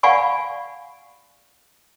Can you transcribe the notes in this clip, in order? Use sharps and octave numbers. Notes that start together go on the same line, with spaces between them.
D5 F5 F#5 G#5 B5 C#6